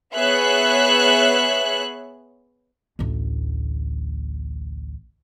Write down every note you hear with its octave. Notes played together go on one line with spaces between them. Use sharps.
B3 G#4 C#5 E5 F#6
A1 D2